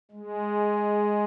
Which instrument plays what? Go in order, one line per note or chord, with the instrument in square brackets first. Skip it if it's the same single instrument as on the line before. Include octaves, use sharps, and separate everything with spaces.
[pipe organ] G#3